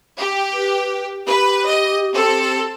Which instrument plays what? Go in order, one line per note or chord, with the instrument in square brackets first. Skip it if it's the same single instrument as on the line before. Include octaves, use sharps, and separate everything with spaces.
[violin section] G4
[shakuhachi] B4
[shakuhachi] G4 [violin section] B4
[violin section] D#5
C4 A4